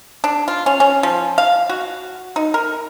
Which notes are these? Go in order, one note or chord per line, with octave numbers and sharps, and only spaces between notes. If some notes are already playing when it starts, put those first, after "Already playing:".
D4
F4
C#4
C#4
F3
F5
F#4
D#4
A#4